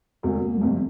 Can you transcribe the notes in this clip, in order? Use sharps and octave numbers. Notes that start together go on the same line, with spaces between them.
E1 D2 C3 A3
A#3
G3
G1 F2 C3 A3